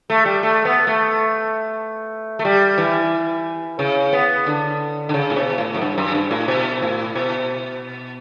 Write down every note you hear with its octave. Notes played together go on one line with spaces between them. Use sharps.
A3
G3
A3
B3
A3
A3
G3
E3
C#3
B3
D3
D3
C#3
A2
B2
A2
F#2
G2
F#2
G2
A2
B2
A2
B2